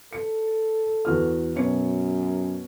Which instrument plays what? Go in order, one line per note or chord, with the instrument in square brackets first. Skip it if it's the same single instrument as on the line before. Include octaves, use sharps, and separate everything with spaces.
[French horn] A4 [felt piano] C#7
[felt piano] E2 F#4 F6
[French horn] F#2 [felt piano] B2 C#5 C#7